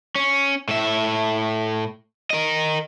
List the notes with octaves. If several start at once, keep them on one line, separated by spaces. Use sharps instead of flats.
C#4
A2 E5
A#4 D#5